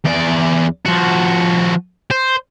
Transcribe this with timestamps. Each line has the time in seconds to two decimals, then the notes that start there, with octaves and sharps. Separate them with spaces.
0.05 E2 D5
0.86 F3 F#4
2.11 C5